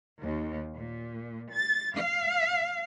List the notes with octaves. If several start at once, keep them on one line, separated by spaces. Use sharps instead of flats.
D#2
A#2
A6
F5